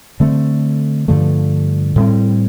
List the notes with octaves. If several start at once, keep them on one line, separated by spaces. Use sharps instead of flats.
D3 A3 C4
G2 D3 F3 A3
A2 G3 C4